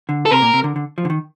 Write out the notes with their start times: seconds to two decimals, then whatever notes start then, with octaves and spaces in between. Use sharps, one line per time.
0.09 D3
0.26 A4
0.31 C3 A#4
0.42 A#2
0.53 C3
0.64 D3
0.76 D3
0.98 F3
1.05 D3
1.10 D#3